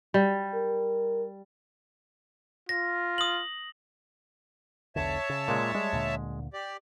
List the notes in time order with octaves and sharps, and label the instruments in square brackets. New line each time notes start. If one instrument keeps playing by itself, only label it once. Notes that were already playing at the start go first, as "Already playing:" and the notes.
[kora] G3
[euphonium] A#4
[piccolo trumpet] F4 [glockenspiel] A#6
[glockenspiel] D#6 F#7
[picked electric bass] B1 E2 D3 [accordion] C#5 E5 A5
[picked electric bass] C#3
[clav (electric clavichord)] A#2 G#3
[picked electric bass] G3 [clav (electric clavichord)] G#3
[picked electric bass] D2 A#2 D3
[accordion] G4 D5